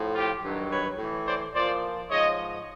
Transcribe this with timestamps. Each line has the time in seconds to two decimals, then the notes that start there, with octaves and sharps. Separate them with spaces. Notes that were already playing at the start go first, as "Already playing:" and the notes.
Already playing: A2 F3
0.14 F4 G4
0.42 G2 D#3 F#3
0.69 B4 C#5
0.98 A2 E3
1.26 C5 D5
1.54 A#2 F3 C5 D5
2.10 G#2 F3 C#5 D#5